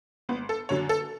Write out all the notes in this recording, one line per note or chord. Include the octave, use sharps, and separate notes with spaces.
G#1 B3
A4
F#2 D3 F#3 C#5
A4